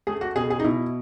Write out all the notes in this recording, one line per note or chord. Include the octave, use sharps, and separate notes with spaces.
A3 G#4
F#4
B2 G#4
G#4
D#4
B2 E4